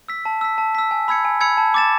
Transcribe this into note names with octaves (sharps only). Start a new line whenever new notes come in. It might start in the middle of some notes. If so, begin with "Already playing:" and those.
E6 B6
A5
E6 B6
A5
E6 B6
G#5
B5 E6 G#6 C#7
G#5
B5 E6 G#6 C#7
A5
D6 A6 E7